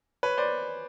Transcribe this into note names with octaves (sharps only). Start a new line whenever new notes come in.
B4 C#5
C5 D5